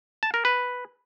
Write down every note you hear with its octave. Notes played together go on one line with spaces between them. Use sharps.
A5
A#4
B4